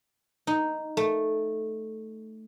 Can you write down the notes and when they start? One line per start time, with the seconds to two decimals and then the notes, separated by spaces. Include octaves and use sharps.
0.47 D#4
0.97 A3